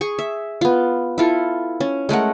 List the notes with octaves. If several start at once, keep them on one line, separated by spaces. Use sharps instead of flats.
G#4 C#6
E5
B3 F4
E4 F4 A4
C#4
G#3 A3 A#4 F#5